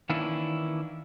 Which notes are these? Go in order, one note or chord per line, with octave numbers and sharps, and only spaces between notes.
D#3 E3 A#3 C#4 D4 E4